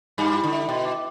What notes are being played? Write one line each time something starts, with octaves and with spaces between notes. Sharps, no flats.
G2 G3 B5
E4
D3
E5
B2 G5
D6